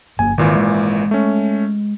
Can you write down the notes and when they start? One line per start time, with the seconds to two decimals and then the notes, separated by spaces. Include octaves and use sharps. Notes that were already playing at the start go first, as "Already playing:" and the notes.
0.19 G1 A#3 G#5
0.38 G#1 A#2 D#3 E3 G3 G#3
0.56 G#3
1.11 A3 C#4